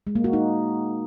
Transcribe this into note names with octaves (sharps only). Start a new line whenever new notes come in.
G#3
A#3
F#4
D#4